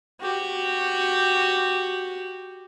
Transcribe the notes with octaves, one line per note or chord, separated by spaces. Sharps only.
F#4 G4